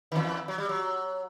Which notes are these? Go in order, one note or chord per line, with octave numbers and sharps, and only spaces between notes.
D#3
E2 E3
F#3
G3
F#3